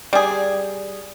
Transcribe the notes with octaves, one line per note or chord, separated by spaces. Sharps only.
G3 G#4